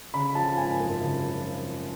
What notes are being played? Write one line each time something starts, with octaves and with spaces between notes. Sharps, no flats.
C#3 B5
F3 A5
G#1 G#5
F#2
C#3
F3